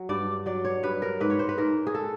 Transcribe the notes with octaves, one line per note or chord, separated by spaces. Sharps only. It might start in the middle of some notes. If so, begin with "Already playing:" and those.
Already playing: F#3
G2 D5
F#3 D5
C#5
G2 B4
A#4
G#2 B4
C#5
C5
B4
G#2 A#4
G#4
A4